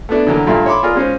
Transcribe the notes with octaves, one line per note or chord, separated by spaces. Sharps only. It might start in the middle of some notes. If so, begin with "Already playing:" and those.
A3 B3 D4 E4
D3 E3 F#3 A#3
G2 A#2 A3 E4 F5
C#5 E5 B5 C6 D6
F4 G#4 A#4 D5
G#3 C#4 F4 C5